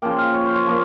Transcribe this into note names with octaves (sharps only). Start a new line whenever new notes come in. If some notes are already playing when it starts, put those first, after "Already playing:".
C#3 F3 A#3 G5
F5
C#5
C5
C#5
F3 A#3